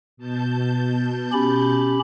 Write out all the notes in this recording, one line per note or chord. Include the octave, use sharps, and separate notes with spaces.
B2 A5 G6
C#4 G4 B5